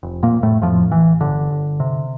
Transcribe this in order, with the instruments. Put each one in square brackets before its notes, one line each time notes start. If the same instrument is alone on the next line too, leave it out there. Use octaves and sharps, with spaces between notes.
[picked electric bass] F1
A#2 A#3
F1
A2 A3
F2 A2 F3
A1 E3
G1 D3
G1
C3